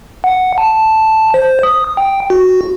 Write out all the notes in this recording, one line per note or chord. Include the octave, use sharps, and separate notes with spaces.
F#5
A5
C5
D#6
G5
F#4